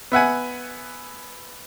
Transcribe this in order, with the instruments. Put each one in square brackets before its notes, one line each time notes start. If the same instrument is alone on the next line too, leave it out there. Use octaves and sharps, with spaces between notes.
[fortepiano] B3 E5 F#5 G#5